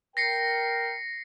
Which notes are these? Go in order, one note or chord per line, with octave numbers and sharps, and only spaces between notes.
A#4 G5 A#6 C7 C#7